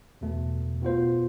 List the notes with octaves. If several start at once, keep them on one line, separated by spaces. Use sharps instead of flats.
E2 B2 A3
B2 B3 F4 C5